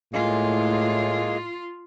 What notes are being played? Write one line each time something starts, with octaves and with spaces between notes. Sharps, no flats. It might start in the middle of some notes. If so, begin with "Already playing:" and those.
A2 G#3 A#3 F4 G#4